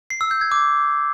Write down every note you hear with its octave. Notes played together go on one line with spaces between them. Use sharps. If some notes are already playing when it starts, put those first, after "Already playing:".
C7
E6
G6
G#6
D6